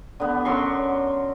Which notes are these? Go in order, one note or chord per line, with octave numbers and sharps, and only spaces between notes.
D3 B3
F#2 C6 C#6